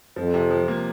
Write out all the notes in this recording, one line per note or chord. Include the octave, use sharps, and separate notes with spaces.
F2 F3
C3
F3
A#3